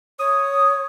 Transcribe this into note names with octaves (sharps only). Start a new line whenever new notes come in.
C#5 D#6